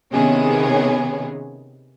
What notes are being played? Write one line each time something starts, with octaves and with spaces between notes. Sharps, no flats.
C3 D#3 B3 C#4 G#4